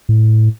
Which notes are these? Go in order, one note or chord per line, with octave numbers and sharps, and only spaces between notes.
A2